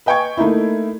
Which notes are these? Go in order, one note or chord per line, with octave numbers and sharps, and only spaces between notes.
B4 D#5 G5 G#5 C#6 G#6
A3 A#3 D#4 E4